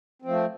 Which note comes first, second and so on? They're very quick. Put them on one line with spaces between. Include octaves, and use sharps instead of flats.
C4 F3 A3